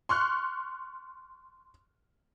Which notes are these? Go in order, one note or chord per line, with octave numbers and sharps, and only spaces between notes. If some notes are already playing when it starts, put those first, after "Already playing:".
C6 C#6 F6 F#6